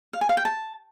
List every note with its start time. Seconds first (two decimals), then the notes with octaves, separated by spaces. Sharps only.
0.13 F5
0.21 G#5
0.29 F5
0.37 G5
0.45 A5